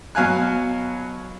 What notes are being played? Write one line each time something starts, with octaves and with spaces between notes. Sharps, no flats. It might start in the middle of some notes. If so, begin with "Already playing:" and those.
B2 F#3 F5 G#5 F#6